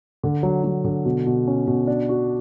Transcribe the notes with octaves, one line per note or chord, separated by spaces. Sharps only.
D3
F#3
F#3
D3
B2
B2
C#4
B2
D4
F#4